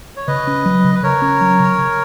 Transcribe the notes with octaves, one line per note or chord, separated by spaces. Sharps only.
C#5
C#3 B4 D#5
C#4
F#3
C#3
B4
C#3 A#4 C#5
C#4
F#3
C#3
C#3